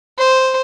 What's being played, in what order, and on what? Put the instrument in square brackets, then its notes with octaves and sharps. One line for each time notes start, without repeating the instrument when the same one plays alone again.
[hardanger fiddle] C5